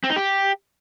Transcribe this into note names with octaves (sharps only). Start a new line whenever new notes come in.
C4
D#4
G4